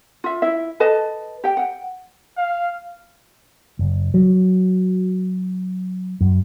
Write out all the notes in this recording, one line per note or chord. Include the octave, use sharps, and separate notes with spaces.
F4 E5
E4 E5
A4 B4 D#5 A5
G4 G5
F#5 G5
F5
F#1
F#3
F#2